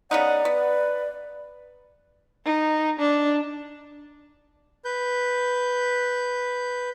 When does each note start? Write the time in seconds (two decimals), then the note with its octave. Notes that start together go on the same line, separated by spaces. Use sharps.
0.11 C#3 B3 D#4 D5 F#5
0.45 B3 B4
2.45 D#4
2.99 D4
4.85 B4 G6